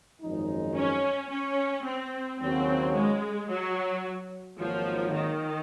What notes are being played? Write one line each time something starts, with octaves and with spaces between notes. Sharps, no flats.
G#1 F#2 F3 G#3 D#4
C#4
C#4
C4
D#2 C#3 F#3 C4 C#4 F#4
G#3
F#3
G#1 G#2 F3 F#3 A#3
D#3